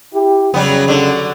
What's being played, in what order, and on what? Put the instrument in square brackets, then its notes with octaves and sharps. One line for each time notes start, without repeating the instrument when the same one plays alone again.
[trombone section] E4 G4
[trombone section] F2 C#3 [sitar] F#3 G3 B3
[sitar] D3 F#3